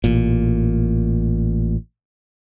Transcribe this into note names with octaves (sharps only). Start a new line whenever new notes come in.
A1 A#2